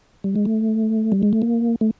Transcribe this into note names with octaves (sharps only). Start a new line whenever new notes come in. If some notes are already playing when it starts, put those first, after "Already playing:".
G3
G#3
A3
G3
G#3
A3
A#3
A3